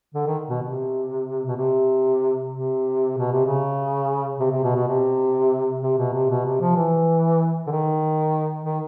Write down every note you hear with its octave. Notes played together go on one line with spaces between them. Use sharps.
D3
D#3
B2
C3
B2
C3
C3
B2
C3
C#3
C3
C3
B2
B2
C3
C3
B2
C3
B2
C3
F3
E3
D3
D#3
D#3